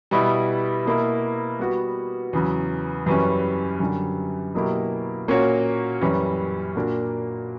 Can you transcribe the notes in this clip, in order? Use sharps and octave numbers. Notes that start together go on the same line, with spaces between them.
B2 G3 B3 E4
B2 A#3 E4
G3 B3 F#4 B4
E2 C#3 F#3
F#2 E3 G3 C#4
F#2 D3 G3
B2 F#3 A#3 E4 G4
A#2 A#3 C#4 F#4 C#5
F#2 E3 G3 C#4
A#2 A#3 D4 F#4 A#4